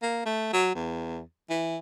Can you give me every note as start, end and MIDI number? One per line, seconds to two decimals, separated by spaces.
0.02 0.22 58
0.26 0.53 57
0.53 0.75 54
0.75 1.22 40
1.50 1.77 52